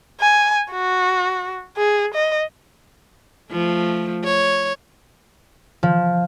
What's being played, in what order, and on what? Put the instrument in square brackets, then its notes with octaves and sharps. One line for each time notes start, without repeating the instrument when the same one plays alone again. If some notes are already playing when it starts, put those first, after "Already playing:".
[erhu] G#5
F#4
G#4
D#5
[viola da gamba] F3 A3
C#5
[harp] F3